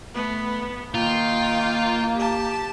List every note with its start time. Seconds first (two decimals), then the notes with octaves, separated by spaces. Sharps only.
0.15 A3 B3
0.94 D#3 A#3 F4 G5
2.15 G4 A5